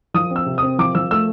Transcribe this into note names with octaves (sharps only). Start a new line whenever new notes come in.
F3 D#6
C4
E6
C3
C4 D#6
F3 D6
F3 E6
A3 E6